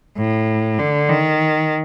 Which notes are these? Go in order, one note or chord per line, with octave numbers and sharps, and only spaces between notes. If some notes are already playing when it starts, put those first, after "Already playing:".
A2
D3
D#3